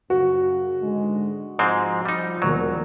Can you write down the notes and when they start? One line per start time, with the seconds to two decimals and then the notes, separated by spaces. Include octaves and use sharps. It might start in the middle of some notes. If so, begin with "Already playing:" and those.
0.10 F#2 C#3 F#4
0.82 G#2 D3 G#3
1.59 G#2 F3 G#3 C4
2.05 G3 D#4
2.42 E1 D#2 F#3 D5